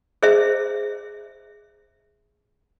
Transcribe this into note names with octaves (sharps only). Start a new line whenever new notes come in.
G#4 C5 E5